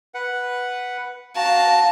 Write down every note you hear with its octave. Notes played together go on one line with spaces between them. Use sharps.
B4 F#5
F#4 F5 A5 A#5